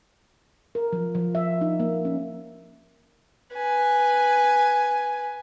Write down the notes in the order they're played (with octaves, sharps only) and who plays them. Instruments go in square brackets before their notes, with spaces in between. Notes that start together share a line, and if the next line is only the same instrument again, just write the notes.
[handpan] A#4
F3
F3
E5
D#4
A#3
C#4
[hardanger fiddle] B4 G#5